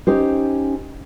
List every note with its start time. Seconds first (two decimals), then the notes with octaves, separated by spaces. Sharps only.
0.07 C#4 D#4 G4 C5